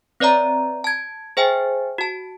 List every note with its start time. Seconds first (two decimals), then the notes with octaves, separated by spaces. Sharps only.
0.20 C4 B4 C#5 D5 E5 A#5
0.84 A5 G#6
1.37 G#4 C5 E5 G5 G#5
1.98 F#4 A5